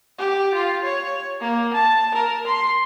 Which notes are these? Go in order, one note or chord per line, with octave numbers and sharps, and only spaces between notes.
G4
F4
C#5
A#3
A5
A#4
C6